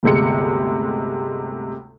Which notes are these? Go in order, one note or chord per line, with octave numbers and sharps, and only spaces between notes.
G1 D2 C3 G#3 C#7